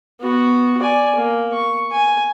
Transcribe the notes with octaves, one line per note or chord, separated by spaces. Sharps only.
B3 F#4
D5 G#5
A#3
C#6
G#5